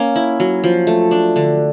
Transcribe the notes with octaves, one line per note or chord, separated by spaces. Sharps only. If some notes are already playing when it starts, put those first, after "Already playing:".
Already playing: A#3 C#4
E4
F#3
F3
A3
D4
D3